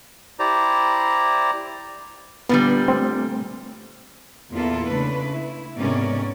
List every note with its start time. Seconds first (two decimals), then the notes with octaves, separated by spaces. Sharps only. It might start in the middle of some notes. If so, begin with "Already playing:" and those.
0.39 E4 G4 C5 D5 A#5
2.49 A#2 D3 G3 B3
2.88 A3 C4
4.52 E2 A#2 E4 F4 A4 A#4
4.88 C#3 A3 D4 B4
5.30 E4
5.75 G#2 C3 B3 C#4 A#4 D5